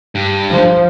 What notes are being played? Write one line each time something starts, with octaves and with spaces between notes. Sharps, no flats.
G2
F3